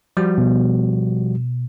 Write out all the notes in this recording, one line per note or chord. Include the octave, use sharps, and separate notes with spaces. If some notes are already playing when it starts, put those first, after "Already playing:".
F3 G3 F#4
B2